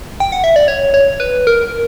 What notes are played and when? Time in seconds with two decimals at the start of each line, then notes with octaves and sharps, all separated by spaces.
0.20 G5
0.32 F#5
0.44 E5
0.56 D5
0.68 C#5
0.94 C#5
1.20 B4
1.47 A#4